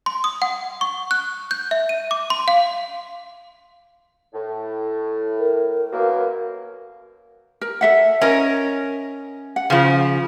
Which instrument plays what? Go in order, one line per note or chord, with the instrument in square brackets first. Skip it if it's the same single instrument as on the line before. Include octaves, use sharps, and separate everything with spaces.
[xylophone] C6
D#6
F#5
C#6
F#6
G6
E5
D#7
D6
C6
F5
[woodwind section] A2
[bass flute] A#4
[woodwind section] F#2 B2 A#3
[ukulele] A#4
A4 E5 F#5
[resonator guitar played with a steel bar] C#4 A#4 [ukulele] D#5
[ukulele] F#5
[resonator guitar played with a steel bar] C#3 F3